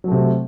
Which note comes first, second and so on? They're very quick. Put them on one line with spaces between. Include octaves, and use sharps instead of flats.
F#3 A3 C3